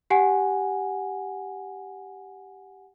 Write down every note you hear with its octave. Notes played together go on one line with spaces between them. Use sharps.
G4 F#5 G#5